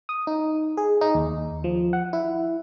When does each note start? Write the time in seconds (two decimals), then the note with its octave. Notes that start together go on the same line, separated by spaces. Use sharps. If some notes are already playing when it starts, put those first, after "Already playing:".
0.09 D#6
0.27 D#4
0.77 G#4
1.01 D#4
1.15 D#2
1.64 F3
1.93 F#5
2.13 E4